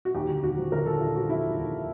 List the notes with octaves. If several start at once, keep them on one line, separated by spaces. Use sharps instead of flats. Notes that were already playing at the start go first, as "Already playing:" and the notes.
F#4
D#2 G4
D3
D#2 F#4
F3
D3 A#4
D3 A4
D#2 F4
F3 F#4
F3 E4
D#2
D#2